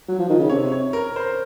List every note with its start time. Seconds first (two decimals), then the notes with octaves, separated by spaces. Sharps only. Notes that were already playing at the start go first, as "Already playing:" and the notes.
0.08 F#3
0.19 F3
0.29 D#3
0.39 C#3
0.49 C3 C#5
0.72 C#5
0.93 A#4
1.16 C5